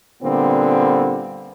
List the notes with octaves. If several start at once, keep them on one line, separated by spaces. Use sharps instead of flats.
A#2 D3 G3 B3 C4